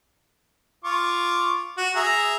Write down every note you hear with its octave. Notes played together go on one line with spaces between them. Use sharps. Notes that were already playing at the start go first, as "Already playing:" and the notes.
F4 C#6 D6
F#4
G#4 E5 A#5